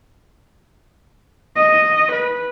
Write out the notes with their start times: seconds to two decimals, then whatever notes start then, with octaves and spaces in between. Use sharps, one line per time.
1.56 D#5
2.12 B4